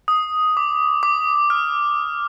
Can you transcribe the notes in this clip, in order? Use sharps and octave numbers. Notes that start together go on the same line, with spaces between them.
D#6
D6
D6
F6